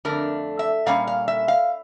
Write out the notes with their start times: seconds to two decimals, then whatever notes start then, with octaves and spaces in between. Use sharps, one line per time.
0.05 F2 D3 A3 D4 A#4
0.59 E5
0.86 A#2 G3 C#4 F5
1.07 F5
1.28 E5
1.48 F5